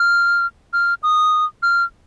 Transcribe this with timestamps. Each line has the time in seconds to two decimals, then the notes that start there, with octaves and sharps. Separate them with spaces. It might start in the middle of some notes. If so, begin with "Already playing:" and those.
Already playing: F6
0.73 F6
1.03 D#6
1.63 F6